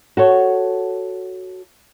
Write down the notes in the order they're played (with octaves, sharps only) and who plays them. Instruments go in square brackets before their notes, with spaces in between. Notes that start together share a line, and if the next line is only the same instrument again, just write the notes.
[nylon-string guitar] F#4 A4 C#5